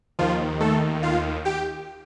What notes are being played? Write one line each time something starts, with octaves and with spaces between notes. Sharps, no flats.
D#2 D#3 F3 F4
A3 A4
F4 F5
G4 G5